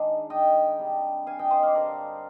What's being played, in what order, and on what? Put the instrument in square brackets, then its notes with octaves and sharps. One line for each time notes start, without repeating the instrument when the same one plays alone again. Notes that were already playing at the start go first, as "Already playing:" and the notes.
Already playing: [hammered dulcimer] D#3 G#3 D4 F5 G#5
D#5 G5
C3 G3 D4
F5 G#5
D#5 G5
C5 D#5
D5 F5
G2 D3 G3 D4 A#4 D5